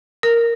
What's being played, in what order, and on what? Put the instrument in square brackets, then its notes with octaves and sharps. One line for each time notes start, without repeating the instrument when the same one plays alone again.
[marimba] A#4